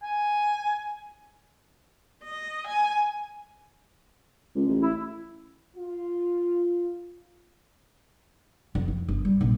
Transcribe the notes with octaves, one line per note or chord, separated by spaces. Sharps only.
G#5
D#5
G#5
C#2
A1
E4
F4
F2
E4
G1
G3
A#1